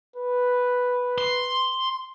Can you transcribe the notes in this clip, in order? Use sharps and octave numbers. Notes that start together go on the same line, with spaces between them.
B4
C6